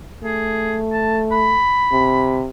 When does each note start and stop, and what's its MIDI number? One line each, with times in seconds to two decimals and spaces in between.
0.23 1.61 57
0.23 0.77 68
0.93 1.19 81
1.32 2.40 83
1.92 2.49 48